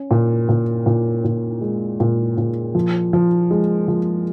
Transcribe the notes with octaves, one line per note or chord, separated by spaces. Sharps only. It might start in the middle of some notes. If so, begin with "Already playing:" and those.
Already playing: C#4
A#2
A#2
A#2
A#2
G#3
A#2
A#2
F3
F3
G#3
F3